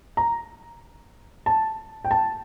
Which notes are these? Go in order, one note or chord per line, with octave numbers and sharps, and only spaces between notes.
A#5
A5
G5
A5